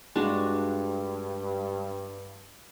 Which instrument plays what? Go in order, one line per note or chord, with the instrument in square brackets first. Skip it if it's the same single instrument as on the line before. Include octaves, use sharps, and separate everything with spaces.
[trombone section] G2 [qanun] G#3 D4 F#4